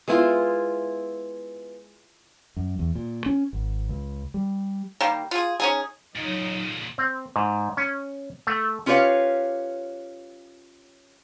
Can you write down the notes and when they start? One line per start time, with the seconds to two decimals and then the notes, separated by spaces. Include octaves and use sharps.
0.08 G#3 B3 E4 F4
2.57 F#2
2.79 E2
2.95 A#2
3.26 C#4
3.53 G#1
3.89 C#2
4.34 G3
5.00 D#3 G3 A#3
5.31 F4 G#4
5.60 C#4 D#4 G#4
6.15 A#2 C#3 F#3 D#4
6.98 C4
7.36 G#2
7.77 C#4
8.47 A3
8.86 C#4 F4 G4 B4 C#5 F5